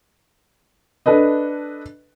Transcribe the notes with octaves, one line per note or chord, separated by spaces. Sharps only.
D4 A4 B4 D#5